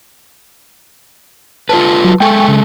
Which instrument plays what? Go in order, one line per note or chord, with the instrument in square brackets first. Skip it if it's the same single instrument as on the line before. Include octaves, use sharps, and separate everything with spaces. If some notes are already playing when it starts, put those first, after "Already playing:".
[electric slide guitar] F4 A4 B4 [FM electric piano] A5
[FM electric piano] F#3 A5
[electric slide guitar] G#3 A4 [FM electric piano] G5 G#5 C#6
[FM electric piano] C#3